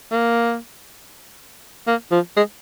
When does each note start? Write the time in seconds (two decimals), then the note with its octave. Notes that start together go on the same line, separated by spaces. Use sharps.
0.12 A#3
1.87 A#3
2.12 F3
2.37 G#3